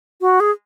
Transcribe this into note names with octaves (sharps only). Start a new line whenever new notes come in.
F#4
G#4